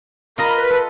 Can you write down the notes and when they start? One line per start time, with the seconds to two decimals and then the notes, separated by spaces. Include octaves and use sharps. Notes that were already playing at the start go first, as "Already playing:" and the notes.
0.38 F4 A#4 D#5 A#5 B5
0.55 B4
0.70 A4